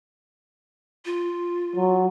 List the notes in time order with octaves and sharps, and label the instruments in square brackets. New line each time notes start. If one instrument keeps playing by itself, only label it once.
[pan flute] F4
[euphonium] F#3